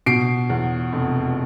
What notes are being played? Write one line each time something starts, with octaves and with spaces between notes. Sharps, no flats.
B2 C7 D7
E2
F1